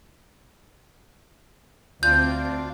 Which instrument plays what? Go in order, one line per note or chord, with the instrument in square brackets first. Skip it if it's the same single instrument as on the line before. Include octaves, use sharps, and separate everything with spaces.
[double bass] D2 [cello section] C4 [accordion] D4 F4 [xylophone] G6